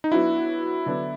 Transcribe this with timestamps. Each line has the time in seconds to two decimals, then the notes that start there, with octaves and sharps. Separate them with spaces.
0.04 D#4
0.12 F#3 B3 D4 E4 F#4
0.86 D3 F#3 B3 D4